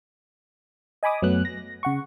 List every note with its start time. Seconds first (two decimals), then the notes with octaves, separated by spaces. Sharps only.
1.03 D#5 G#5 B5 D6 D#6
1.22 F#2 F#3 A3 B3 F#6
1.45 A#6
1.83 C#3 F#5 C#6